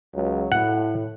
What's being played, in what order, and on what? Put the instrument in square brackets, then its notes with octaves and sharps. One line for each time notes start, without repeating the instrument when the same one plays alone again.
[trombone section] C#2 F#3
[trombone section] A2 [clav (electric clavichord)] F#5